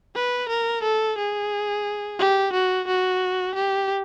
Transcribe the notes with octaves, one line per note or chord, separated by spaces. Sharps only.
B4
A#4
A4
G#4
G4
F#4
F#4
G4